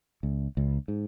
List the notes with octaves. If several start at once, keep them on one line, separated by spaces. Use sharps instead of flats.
C#2
C#2
G#2